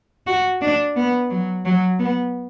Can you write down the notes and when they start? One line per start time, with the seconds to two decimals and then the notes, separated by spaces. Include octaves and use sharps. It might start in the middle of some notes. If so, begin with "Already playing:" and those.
0.27 F#4
0.62 D4
0.96 B3
1.30 F#3
1.65 F#3
1.99 B3